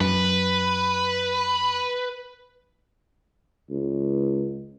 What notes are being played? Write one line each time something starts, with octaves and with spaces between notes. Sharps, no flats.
F#2 B4
C#2